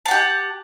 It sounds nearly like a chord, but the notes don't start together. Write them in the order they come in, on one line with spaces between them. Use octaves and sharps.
A5 F#5 G4